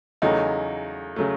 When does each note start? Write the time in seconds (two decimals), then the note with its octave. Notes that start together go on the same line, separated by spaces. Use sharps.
0.22 E2 C#3 F#3 A3 D#4
1.16 C#3 F#3 A3